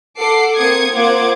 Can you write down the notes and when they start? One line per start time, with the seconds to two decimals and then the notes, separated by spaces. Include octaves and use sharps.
0.17 A4 F#5 D6 C7
0.56 A#3 C4 D#6 G#6 C#7
0.92 A#3 F4 C5 F#5 D6 G#6